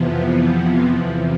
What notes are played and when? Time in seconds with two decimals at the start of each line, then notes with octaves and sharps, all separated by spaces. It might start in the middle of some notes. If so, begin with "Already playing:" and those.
Already playing: F2 C3 E3 F3 B3
0.15 F3
0.87 E2 C3 E3